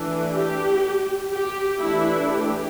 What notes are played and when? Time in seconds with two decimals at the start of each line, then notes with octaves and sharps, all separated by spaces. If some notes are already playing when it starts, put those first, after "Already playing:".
Already playing: E3 A3 D4
0.32 G4
1.31 G4
1.81 E3 A3 D4 E4
2.32 G4